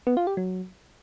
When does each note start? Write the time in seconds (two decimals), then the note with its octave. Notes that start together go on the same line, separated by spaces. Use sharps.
0.07 B3
0.17 F4
0.27 G4
0.37 F#3